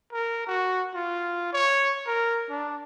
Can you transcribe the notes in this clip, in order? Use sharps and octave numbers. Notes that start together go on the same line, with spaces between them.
A#4
F#4
F4
C#5
A#4
D4